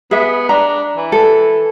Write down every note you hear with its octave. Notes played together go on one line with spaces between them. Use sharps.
B3 G#4 E5
D4 A#5
E3
A4